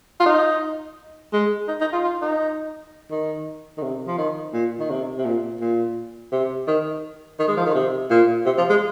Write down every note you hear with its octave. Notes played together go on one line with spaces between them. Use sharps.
F4
D#4
G#3
D#4
D#4
F4
F4
D#4
D#3
D#3
C3
F3
D#3
A#2
D#3
C3
C3
A#2
A#2
C3
D#3
D#3
G#3
F3
D#3
C3
A#2
C3
F3
G#3